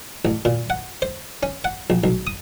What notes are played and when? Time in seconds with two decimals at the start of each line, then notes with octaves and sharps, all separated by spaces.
0.25 A1
0.45 A#2
0.70 F#5
1.02 C5
1.43 C#4
1.64 F#5
1.90 A#1
2.04 B1
2.27 D#6